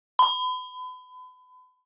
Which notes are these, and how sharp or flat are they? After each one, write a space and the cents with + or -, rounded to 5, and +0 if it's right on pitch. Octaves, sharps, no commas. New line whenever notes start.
B5 +35